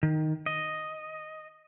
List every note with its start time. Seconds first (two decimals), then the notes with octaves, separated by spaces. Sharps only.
0.03 D#3
0.46 D#5